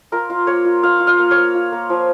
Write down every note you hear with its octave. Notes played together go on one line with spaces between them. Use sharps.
F4 A#4
F4
A#3 C#5
F4
F4 F5
F4
F5
A#3
A#3 C#5
F4
A#3
F3